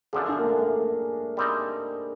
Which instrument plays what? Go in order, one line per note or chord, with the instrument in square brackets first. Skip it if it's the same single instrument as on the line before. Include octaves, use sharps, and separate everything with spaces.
[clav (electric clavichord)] F#2 D3 F3 [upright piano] G#4
[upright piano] D4
A#3
A3
A3
[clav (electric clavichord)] G3 C4 D#4